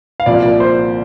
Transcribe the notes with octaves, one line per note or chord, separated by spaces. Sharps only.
F5
C2 A#2 F3 D5
D5
C5